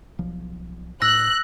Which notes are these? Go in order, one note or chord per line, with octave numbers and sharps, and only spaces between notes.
B1 F3
A2 E6 F#6 A#6